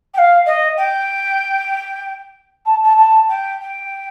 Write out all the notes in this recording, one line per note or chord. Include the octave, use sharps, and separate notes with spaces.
G5
F5
D#5
G5
A5
A5
A5
G5
G5